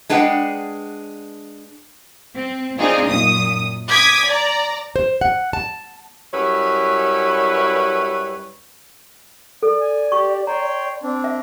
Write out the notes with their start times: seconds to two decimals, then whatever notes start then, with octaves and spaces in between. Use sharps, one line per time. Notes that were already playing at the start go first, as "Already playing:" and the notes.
0.09 G#3 D4 G#4 B4 F#5 G5
2.36 C4
2.78 C4 D4 D#4 F4 G#4
3.08 F#2 A#2 D#6
3.89 D6 D#6 G#6 B6
4.27 D5 A#5
4.96 C5
5.21 F#5
5.53 A5
6.34 F#2 G3 E4 B4 C#5
9.63 A4 D5
9.80 G#5
10.12 G4 C#6
10.47 C#5 G5 A#5 C6
11.03 C4 D4
11.24 E5